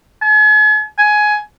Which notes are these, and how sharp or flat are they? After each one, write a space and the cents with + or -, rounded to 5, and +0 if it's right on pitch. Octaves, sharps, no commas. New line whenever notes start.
G#5 +45
G#5 +15